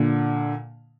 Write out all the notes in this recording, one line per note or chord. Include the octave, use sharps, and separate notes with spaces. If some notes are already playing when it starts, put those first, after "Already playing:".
Already playing: A#2 D3